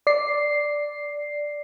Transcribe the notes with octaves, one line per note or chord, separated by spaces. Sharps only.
D5 C7